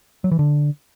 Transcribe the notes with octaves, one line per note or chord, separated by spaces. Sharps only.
F#3
E3
D3